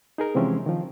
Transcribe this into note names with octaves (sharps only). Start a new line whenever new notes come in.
D#4 G#4 A#4
C3 E3 F3 G#3 C4 C#4
D#3 F3